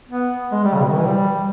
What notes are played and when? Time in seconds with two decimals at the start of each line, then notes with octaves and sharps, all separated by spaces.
0.09 B3
0.52 G#3
0.64 G3
0.74 C#3
0.82 B2
0.90 D#3
0.98 E3
1.07 G3